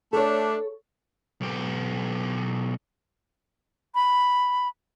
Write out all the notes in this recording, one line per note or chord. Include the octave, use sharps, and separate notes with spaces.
A3 D4 A4 C#5
B1 G4
B5